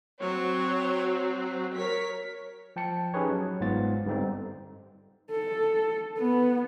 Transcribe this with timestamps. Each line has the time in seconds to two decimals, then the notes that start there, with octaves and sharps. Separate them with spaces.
0.21 F#3 C4 C#5
1.75 A#4 C#5 B6
2.76 F3 G5 A5 C#7
3.14 C#4 D#4 G4 G#4 B4 C#5
3.29 F#3
3.60 G1 G#2 B3 F4 A6
4.06 G2 D3 C4 D#4
5.31 A4
6.19 B3